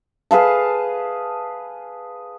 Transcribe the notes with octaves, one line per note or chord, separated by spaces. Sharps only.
G#4 B4 F5 A5